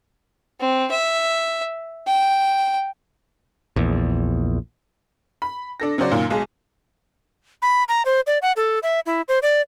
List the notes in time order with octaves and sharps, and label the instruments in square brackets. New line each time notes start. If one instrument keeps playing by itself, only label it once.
[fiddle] C4
E5
G5
[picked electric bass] A#1 E2
[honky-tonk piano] B5
D4 A4 A#6
C#3 F#3 F#4 C5 D5
F#2 A#2 D#3
B1 G#3
[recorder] B5
A#5
C5
D5
F#5
A4
E5
E4
C5
D5